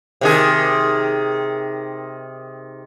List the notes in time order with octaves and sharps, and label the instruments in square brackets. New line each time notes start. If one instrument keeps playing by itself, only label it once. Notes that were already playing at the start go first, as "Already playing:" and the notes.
[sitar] C3 D#3 G#4